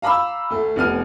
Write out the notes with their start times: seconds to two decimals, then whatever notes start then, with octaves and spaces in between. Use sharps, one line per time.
0.02 F5 A#5 B5 D6 E6
0.50 D2 A3
0.76 F1 B3 F6 D#7